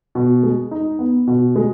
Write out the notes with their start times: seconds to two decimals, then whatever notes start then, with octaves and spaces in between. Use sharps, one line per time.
0.15 B2
0.43 G#3
0.71 D#4
0.99 B3
1.27 B2
1.56 G#3